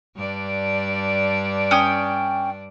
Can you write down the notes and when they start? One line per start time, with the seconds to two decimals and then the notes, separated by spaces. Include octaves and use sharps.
0.16 G2 D4 D5
1.71 C#4 G5 D#6